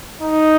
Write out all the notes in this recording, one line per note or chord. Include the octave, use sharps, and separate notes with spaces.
D#4